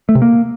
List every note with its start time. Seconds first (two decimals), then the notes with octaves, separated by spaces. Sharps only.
0.09 A3
0.15 C3
0.22 A#3